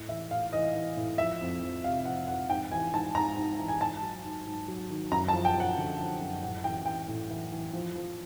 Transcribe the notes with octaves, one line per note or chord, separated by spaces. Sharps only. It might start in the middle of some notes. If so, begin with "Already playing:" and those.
Already playing: A2
E3 E5
A2 F5
E3 D#5
E3
A2
F3 E5
F2
F3
C3 F5
F3 F#5
F2 F#5
G#2 G5
E3 G#5
G#2 A5
G#2 A#5
G#2
E3
G#5
G#2 A5
F#3
G#2
G#2
F#3
D#3
F#2 A#5
A5
F3
G5
F3 F#5
D3
F3
F#2
A2 F#5
E3 G5
E3 G5
A2
E3
E3
F3
F3